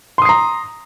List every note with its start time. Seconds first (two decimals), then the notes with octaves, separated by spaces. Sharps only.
0.18 C6
0.22 D#6
0.25 C7
0.29 A#5